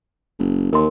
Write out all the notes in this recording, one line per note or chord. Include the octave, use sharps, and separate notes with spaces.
F#1
D#2 A#4 C6